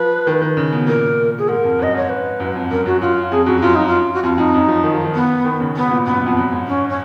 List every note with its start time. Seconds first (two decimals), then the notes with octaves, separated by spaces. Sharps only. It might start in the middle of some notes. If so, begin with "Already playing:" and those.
Already playing: F3 B4
0.27 D#3
0.42 D#3
0.57 C#3
0.72 B2
0.87 A#2 A#4
1.38 G#4
1.48 G#2 A#4
1.64 F2
1.79 F#2 D#5
1.94 G#2 C#5
2.09 B4
2.40 F#2
2.55 F2
2.71 F#2 A#4
2.86 F#2 F#4
3.02 F#2 F4
3.31 F2 G#4
3.46 F#2 F#4
3.61 F#2 F4
3.75 D#4
3.87 F4
4.14 F#4
4.23 F2 F4
4.38 F2 D#4
4.54 F#2
4.68 F3
4.84 D#3
4.94 F3
5.05 D#3
5.15 B3
5.45 D#3
5.60 C#3
5.75 B2 B3
5.85 G#2
5.91 A#2
6.06 F#2 B3
6.16 F#2
6.26 F2
6.37 F#2
6.52 G#2
6.67 C#4
6.89 C#4